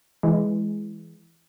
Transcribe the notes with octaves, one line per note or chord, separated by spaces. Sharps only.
E3 G#3